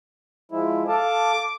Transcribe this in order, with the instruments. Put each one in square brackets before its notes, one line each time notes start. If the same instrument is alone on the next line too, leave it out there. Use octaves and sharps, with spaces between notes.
[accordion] F3 G#3 E4
[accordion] A4 F5 A5 [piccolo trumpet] D6